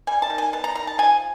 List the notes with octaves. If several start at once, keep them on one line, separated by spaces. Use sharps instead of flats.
G3 G#5
A5
D#3
G#5
B3 A5
A#5
D#3 A#5
A5
F3 G#5